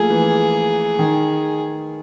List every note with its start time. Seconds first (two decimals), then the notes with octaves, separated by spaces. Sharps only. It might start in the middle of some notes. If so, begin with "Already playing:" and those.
Already playing: F3 A3 A#3 G#4
0.10 E3
0.99 D#3